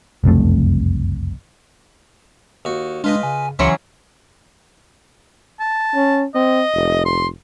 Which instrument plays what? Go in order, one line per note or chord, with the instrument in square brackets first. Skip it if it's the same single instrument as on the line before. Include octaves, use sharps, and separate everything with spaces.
[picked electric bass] F#1 C2 F2 A3
[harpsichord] D#2 F#4
[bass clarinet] G#3 [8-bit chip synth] D4 [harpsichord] F4 B4 D#5
[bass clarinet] C#3 [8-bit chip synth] G#5
[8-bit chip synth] C#2 C6 C#7 [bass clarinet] C#3 [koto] E3 F#3 C#4 [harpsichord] E5
[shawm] A5
[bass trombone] C#4
[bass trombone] C4 [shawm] D#5
[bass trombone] F1
[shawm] C6